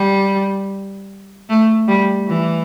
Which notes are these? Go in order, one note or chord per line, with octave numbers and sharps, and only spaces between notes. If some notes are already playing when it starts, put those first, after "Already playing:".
Already playing: G3
A3
G3
E3